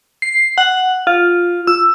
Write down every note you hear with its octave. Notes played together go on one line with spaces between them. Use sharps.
C7
F#5
F4
E6